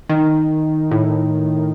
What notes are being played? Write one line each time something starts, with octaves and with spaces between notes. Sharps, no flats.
D#3
A2